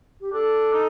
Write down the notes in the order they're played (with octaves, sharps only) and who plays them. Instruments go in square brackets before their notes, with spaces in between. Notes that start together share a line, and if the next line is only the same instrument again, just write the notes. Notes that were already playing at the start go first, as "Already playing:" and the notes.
[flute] G4
[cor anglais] D4 [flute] A4
[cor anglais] D#4